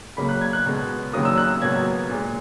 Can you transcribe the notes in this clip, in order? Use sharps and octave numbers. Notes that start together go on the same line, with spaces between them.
C#2 C#3 F#3 A#3 B5
F#6
G#6
F#6
C#2 B2 G#3
D#2 C#3 F#3 A#3 D#6
E6
F#6
E6
C#2 B2 F#3 A#3 G#6
A#2 G#3